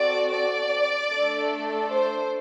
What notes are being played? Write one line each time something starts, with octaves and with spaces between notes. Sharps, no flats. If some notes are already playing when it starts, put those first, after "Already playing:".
Already playing: C4 F#4 A4 D5
D5
A3 D4 A4
C5